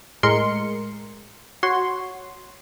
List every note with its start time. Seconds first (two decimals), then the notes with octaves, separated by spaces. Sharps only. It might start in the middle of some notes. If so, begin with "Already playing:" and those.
0.23 A2 G#3 A#4 C6 C#7
1.63 F#4 C#5 C6